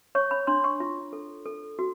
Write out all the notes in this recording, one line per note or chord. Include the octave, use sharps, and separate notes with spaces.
C#5 C#6
B5
D4 C6
C#6
F4
A4
A4
F#4